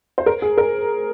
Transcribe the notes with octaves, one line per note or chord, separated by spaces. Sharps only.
C5
A#4
G#4
A#4